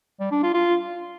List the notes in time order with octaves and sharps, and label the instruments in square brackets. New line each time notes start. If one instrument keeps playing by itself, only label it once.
[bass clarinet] G3
D4
F4
F4